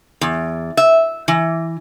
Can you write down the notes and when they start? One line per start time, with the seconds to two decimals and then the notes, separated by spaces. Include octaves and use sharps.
0.21 E2
0.77 E5
1.28 E3